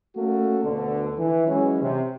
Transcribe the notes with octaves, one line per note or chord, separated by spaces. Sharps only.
A3 A#3 C#4 F#4 A4
D2 B2 D3
E3
E3 F#3 G#3 C#4
C3